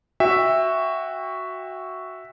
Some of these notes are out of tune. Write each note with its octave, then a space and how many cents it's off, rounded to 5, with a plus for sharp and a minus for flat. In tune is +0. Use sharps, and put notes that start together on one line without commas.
F#4 +0 E5 +0 G5 +30